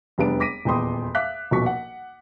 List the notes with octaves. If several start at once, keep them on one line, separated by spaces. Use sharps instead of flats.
F1 E2 G3 B3 D4 D7
D6 A#6 B6 D7 D#7
D#1 E2 G5 B5 C6 D#6
E5 F5 D6 F#6 B6
D#1 B1 B2 F3 C#6 B6
F#5